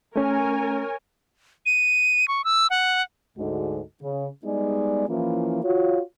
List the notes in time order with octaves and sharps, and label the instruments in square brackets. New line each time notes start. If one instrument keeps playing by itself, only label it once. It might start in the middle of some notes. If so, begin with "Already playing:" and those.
[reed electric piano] A3 C#4 [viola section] A#4 C#5 G#5
[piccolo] D#7
C#6
E6
F#5
[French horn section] D2 G#2 D3 G#3 D#4 F#4
C#3
G3 G#3 B3 D#4 G#4 D5
E3 F3 A#3 C#4 E4 F4
F4 F#4 C#5